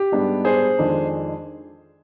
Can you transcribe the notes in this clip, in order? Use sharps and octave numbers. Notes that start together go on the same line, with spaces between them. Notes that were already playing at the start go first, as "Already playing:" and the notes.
Already playing: G4
G#2 G3 B3 D4
G#4 C5
F2 D#3 G#3 D4